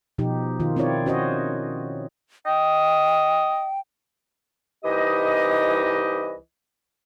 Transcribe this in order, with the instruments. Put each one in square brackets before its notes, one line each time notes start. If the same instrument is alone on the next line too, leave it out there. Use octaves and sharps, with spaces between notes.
[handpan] B2 F3 D#4 G4
D#3 F4
C4 E4 F4 C#5 D5
C#4 F#4 C5 C#5 D#5
[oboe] D#5 [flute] G5
[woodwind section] C2 E3 D#4 G4 D#5